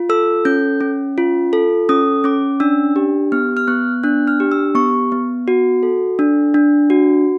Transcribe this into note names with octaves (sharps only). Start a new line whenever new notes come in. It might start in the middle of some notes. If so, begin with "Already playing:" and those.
Already playing: F4
A4 E6
C#4 G6
C#4
F4
A4
C#4 D#6
C#4 D6
D4 E6
G4
B3 F6
F6
B3 F#6
D4 F#6
F6
G4
E6
B3 C#6
B3
F#4
A4
D4
D4
F#4